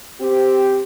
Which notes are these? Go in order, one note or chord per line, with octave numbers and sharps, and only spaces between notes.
C4 G4